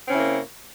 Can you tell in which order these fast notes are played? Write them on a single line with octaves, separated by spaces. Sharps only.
C4 C#4 C#3 E4 A#3